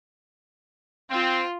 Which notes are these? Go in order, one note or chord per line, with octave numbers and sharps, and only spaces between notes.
C4 F4